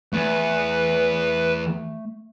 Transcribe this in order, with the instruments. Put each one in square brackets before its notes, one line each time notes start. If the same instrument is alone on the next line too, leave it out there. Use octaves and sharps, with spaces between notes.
[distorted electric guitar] E2 [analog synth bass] A3 [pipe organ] B4